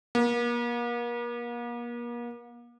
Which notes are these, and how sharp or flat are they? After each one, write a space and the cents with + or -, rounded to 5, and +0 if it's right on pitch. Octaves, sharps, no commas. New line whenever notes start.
A#3 +40